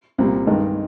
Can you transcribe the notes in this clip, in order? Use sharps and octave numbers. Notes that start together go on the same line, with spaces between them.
C2 A#2 G3
G2 D#3 G#3 D#4